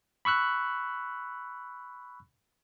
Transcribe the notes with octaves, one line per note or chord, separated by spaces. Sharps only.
B5 C#6 E6 F#6